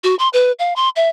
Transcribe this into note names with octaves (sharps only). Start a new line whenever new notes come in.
F#4
C6
B4
F5
C6
E5